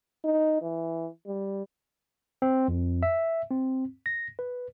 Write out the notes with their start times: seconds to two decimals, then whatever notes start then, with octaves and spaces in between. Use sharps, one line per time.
0.24 D#4
0.62 E3
1.27 G3
2.42 C4
2.68 F2
3.03 E5
3.50 C4
4.06 A#6
4.39 B4